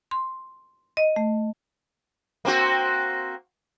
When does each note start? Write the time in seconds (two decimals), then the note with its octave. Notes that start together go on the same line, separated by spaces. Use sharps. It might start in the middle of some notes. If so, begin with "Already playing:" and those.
0.11 C6
0.97 D#5
1.16 A3
2.45 A#3 C4 F#4